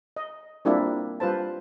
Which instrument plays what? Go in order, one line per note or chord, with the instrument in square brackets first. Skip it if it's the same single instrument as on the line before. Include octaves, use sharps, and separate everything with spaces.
[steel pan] D#5
G3 A#3 C4 D4 E4 F4
G3 F4 B4 C5 A5